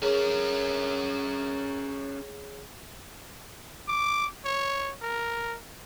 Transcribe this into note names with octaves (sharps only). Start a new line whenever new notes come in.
C#4 G#4 A#4 C#5 A#5
D6
C#5
A#4